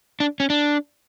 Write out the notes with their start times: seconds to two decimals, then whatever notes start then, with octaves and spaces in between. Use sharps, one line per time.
0.20 D4
0.40 C#4
0.50 D4